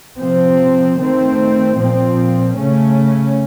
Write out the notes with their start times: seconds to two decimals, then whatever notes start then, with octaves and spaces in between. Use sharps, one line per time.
0.18 C3 F3 C4
0.97 D#3 A3 C4
1.78 A#2 F3 C4
2.57 C#3 A3 C#4